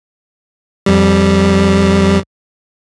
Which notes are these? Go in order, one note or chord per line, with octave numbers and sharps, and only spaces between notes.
F2 G3